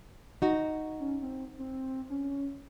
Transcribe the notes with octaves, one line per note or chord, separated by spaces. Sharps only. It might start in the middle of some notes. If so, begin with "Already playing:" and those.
D#4 F#4
C#4
C4
C4
C#4